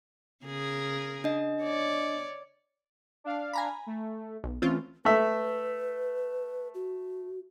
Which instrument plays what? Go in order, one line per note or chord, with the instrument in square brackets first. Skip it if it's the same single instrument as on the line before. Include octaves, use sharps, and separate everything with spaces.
[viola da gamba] C#3 G#4 A#4
[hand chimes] D4 D#5
[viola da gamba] C#5 D5
[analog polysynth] D4 F5
[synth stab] G#5 A#5 B5
[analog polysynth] A3
[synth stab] B1
[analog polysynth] E3 A3 [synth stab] C4 C#4 F4
[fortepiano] A3 E5 [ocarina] B4
[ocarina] F#4